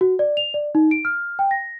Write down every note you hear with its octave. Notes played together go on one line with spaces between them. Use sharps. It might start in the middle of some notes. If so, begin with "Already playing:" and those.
F#4
D5
F7
D5
D#4
D7
F6
G5
A#6